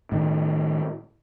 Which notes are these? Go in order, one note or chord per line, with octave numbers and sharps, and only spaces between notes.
A2 D#3